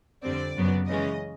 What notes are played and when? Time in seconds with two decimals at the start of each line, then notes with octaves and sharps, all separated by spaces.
0.23 F2 D3 G3 C4 D5
0.56 F#2 C#3 F#3 B3
0.89 C#3 E3 G#3 C#4 D#5